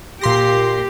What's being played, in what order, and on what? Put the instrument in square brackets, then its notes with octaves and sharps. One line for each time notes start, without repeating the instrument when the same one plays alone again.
[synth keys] A#2 C6 A#6 [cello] G4